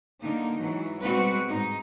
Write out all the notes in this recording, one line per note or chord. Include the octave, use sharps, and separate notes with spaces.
D3 G3 A#3 D#4
G#2 E3 F#3
B2 G3 G#3 C4 F#4 B4
G#2 D#4